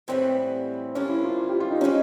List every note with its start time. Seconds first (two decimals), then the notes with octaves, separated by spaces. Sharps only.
0.08 A2 E3 G3 B3 C4
0.95 F3 A#3 C#4 D4
1.09 E4
1.24 F4
1.39 F4
1.49 G4
1.60 F4
1.71 D#4
1.81 G#3 C4 C#4 D#4